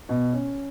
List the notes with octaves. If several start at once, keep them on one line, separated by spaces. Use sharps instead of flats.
B2
C#4